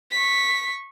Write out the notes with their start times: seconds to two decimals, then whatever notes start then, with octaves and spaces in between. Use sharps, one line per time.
0.11 C#6 B6